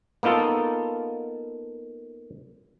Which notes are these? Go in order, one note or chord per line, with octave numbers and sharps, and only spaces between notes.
A#3 B3 D#4 F4 A4